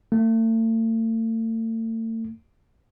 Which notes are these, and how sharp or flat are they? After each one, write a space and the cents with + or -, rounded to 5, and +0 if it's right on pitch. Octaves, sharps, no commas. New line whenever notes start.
A3 +40